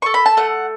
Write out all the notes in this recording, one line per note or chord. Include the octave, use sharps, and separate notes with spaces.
A4 C#6
B5
A5
A3 F#5